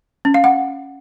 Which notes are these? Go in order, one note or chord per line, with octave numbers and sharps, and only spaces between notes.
C#4
F5
F#5